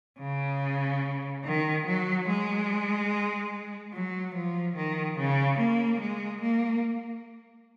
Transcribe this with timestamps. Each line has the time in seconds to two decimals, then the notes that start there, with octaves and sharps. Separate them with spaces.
0.20 C#3
1.44 D#3
1.86 F#3
2.28 G#3
3.93 F#3
4.35 F3
4.76 D#3
5.17 C#3
5.58 A#3
6.00 G#3
6.41 A#3